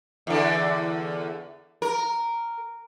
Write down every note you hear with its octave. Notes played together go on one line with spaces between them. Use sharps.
E2 D3
A#4